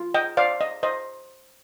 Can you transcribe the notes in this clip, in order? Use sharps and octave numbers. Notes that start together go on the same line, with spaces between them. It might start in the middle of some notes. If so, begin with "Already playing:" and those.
Already playing: F4
D#5 G5
C5 D5 F5
D#5
C5 D#5